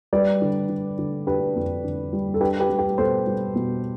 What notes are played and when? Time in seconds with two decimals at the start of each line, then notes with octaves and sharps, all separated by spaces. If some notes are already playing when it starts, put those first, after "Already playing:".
0.13 G3 B4 D5
0.42 D3
0.69 D3
0.98 D3
1.27 D4 G4 B4
1.56 F2
1.84 D3
2.13 G3
2.34 A4
2.41 D4 G4 B4
2.60 G4 B4
2.70 G3
2.79 G4
2.98 B2 A4 C5
3.27 G3
3.55 B2